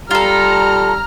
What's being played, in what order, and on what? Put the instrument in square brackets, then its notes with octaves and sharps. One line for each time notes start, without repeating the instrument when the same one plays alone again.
[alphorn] G3 [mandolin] F4 A4 [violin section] A#5 [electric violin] F6